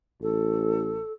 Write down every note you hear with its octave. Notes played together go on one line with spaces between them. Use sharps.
A1 A4